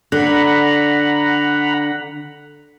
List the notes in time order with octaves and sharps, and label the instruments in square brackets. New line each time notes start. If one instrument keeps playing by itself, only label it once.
[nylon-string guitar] D3 [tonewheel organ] F#5 A#5 B5